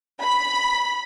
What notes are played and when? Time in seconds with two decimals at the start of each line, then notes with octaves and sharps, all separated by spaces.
0.22 B5